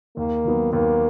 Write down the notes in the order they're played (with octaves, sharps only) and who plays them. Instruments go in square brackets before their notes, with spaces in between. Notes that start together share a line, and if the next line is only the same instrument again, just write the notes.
[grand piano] D#2 [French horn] A#3
[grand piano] D#3 F#3 B3
[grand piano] D#2 [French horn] A#3